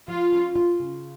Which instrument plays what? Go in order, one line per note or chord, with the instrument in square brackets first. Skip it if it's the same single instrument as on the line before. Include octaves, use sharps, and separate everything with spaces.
[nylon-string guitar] F3 [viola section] F4
[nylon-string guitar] C#4
F4
C#3